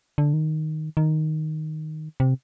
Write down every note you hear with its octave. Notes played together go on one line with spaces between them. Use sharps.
D3
D#3
D#3
C3